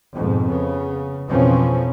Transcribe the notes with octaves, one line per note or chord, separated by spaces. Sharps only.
F2 G#2 B2
C#3 B3
F2 B2 E3 F3 C4 C#4